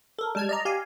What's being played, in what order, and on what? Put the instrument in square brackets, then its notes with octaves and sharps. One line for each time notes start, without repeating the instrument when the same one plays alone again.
[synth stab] A4 A#4
G3 G#3 A5 F6 G#6
D5 D#5 A#5
G4 F5 G#5